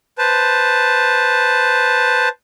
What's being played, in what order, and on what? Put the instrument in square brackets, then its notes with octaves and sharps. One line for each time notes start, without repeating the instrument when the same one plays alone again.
[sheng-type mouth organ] B4 C5 A5